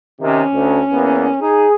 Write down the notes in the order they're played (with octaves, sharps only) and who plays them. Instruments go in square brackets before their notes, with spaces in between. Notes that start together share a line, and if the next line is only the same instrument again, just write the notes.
[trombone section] C3 D#3 [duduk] C#4
[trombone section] D2
E2 A#3 B3
[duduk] D#4 [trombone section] G#4